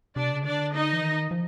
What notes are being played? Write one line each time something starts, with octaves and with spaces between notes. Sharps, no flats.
C3 D4 D5
C#3
D3 D4 D5
D#4 D#5
E3
D#3
F3